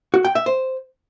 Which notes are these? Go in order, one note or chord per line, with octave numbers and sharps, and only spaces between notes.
F#4
G5
E5
C5